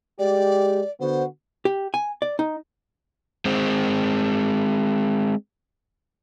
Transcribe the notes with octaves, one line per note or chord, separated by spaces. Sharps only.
G#3 G4 D5
D3 B3 F#4 C5
G4
G#5
D5
D#4
G#3 C4